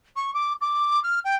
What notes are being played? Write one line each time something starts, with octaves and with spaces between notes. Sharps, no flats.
C#6
D6
D6
F6
G5